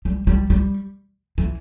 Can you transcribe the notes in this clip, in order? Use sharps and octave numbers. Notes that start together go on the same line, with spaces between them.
G3
G3
G3
E3